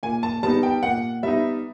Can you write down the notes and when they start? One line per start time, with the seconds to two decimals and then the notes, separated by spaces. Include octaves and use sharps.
0.03 A#2 G#5
0.23 A5
0.43 G3 B3 D#4 A5
0.63 G5
0.83 A#2 F#5
1.23 G3 B3 D#4 E5